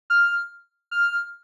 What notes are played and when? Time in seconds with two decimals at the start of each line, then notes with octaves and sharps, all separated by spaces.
0.10 F6
0.91 F6